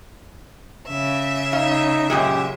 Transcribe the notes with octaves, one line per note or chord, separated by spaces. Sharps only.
C#3 E5
D#4 F5
F#2 A#2 G#3 G4